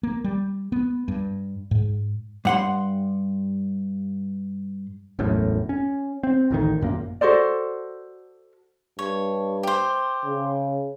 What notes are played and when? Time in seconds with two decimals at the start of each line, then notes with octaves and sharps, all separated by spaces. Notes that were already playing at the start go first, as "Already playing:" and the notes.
0.03 A#3
0.24 G3
0.72 B3
1.08 G2
1.71 G#2
2.45 G2 F#5 C6
5.19 E1 A1 F#2 A2
5.69 C#4
6.23 C4
6.51 A1 D2 D#3
6.81 G#1 F#2 A#2 A#3
7.21 F#4 A4 C5 D5
8.99 G2 C#5
9.63 G4 C5
10.25 C#3